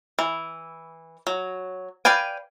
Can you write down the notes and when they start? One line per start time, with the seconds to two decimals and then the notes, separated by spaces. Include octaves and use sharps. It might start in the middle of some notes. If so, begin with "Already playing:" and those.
0.19 E3
1.27 F#3
2.05 B4 D5 F5 G5 G#5